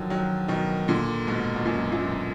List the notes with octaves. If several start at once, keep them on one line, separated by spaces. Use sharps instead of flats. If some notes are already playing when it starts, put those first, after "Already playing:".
Already playing: D3 D#3 F3 F#3
D#3 F#3
B2 D#3
A#2 D3
G#2 B2
B2
F#2 A#2
F#2 A#2